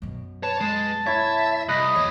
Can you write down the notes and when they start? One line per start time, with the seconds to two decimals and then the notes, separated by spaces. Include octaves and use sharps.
0.02 F#2 B2
0.43 B4 C#5 A5
0.60 G#3
1.07 E4 C#5 E5
1.69 C2 D#5 B5 F#6
1.96 E2 A#3 C#5